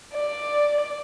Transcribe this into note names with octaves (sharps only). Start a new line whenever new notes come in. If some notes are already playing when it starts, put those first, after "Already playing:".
D5